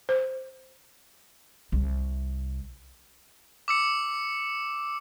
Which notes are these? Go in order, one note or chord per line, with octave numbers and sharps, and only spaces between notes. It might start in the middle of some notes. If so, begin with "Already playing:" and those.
C5
C2
D6 E6 C#7